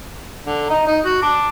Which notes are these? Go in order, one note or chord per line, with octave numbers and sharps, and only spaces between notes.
D3
D#5 A#5
D#4
F#4
A5 D6